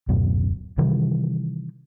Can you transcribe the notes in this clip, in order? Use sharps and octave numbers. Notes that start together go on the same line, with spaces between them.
D1 F#2 B2
C3 D#3 E3 G3